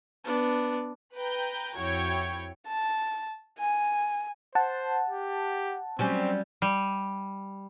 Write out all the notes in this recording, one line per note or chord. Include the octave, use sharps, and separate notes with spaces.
B3 D4
B4 G5 A#5 G6
F2 E4 F#4 C#5 G5 G#6
A5
G#5
C5 F#5 A5
G4
F#3 G3 C4 C#4
G3